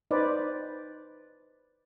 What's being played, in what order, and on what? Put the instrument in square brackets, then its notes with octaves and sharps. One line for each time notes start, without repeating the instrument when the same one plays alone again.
[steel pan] D#4 B4 C5 D5